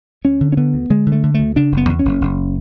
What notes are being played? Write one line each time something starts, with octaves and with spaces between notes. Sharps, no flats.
D2 C#4
D3
C#4
D3 B3
D2
D3 G#3
D3
A3
D3
D2 A3
C#3 D4
F#1
B3
E2
C#4
F#1
F#1